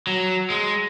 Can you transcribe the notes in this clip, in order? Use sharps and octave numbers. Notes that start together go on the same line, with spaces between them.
F#3
G#3